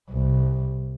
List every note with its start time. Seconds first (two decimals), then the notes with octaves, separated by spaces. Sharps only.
0.11 C2